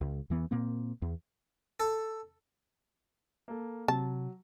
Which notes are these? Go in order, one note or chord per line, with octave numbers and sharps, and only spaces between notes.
C#2
E2 E3 B3
A#2 A#3 C4
E2
A4
A#3 A4
C3 F#3 A5